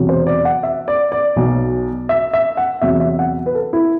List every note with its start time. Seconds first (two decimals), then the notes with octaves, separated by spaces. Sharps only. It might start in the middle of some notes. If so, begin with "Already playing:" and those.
Already playing: E1 E2 C3 F#3
0.09 C5
0.27 D5
0.45 F#5
0.63 E5
0.88 D5
1.12 D5
1.36 B1 B2 F#3
2.09 E5
2.33 E5
2.57 F#5
2.82 E2 C3 F#3 E5
3.00 E5
3.19 F#5
3.46 B4
3.55 A4
3.73 E4